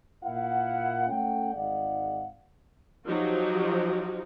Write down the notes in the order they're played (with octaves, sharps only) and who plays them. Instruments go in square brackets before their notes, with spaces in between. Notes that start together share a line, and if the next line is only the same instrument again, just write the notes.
[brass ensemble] A#2 A#3 E4 F5 F#5
A3 C#4 F#5 G5
G#1 G#2 D#4 D5 F5 F#5
[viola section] F3 F#3 D#4 F#4 G4